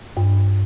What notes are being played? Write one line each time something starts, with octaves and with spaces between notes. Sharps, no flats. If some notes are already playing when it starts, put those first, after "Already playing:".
G2